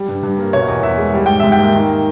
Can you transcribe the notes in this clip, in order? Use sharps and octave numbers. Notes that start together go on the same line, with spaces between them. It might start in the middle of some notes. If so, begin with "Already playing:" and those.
Already playing: G3
G2
G2
A#3
B2 C#5
E2
E2 E5
G#3
G3
G#2 G5
G#2 E5
G5
A#3
D#3